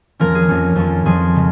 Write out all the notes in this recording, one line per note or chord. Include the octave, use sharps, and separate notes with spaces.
F2 F3 A#3 C#4 A#4
G#4
F2 F3 A#3 C#4
F2 F3 C#4
F2 F3 C#4 G#4
C#3 G#3